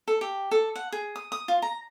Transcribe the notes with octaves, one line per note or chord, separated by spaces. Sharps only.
A4
G4
A4
F#5
G#4
D#6
D#6
F4
A#5